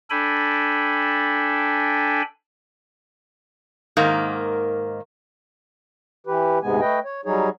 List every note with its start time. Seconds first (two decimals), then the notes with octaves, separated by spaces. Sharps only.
0.10 D4 A4 G5 G#5 B5
3.97 G#2 D#3 A#3
6.27 E3 G4 B4
6.63 D2 G#2 C3 G#3 B3 G#5
6.80 A3 B4 D#5 G5
7.05 C#5
7.25 F#3 G3 D#4 G#4 C#5